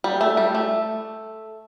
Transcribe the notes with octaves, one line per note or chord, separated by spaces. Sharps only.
G3
A3
G3
A3